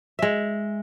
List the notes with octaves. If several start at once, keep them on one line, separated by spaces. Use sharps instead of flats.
G#3 E5